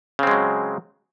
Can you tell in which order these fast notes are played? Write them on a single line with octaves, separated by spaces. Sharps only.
C#3 C4 G#3 F#3